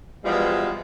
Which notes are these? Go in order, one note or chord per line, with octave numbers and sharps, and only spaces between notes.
B2 E3 F3 G3 G#3